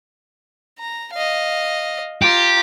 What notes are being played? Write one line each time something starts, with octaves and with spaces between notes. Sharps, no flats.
A#5
D#5 F5
F4 G4 A#5